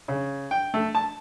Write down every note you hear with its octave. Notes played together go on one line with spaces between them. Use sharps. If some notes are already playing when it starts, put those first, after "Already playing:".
C#3
G5
A3
A5